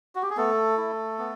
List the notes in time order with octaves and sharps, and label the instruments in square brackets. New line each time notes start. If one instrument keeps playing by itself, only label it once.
[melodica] F#4
G4
G#4
A3 B3 A4
E4
B3